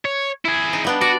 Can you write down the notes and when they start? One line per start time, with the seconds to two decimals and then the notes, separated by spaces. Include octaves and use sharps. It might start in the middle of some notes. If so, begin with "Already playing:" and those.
0.05 C#5
0.45 E4 G#4
0.73 D#4
0.84 G3 B3 D4
1.01 F#4 D5